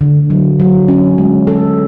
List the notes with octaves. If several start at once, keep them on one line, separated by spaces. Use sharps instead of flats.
D3
F#3
F#3
C#4
G#3
A4